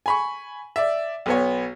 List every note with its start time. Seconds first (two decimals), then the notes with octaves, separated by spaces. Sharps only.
0.06 G#5 B5 C#6
0.76 D5 E5
1.26 B1 B3 C#5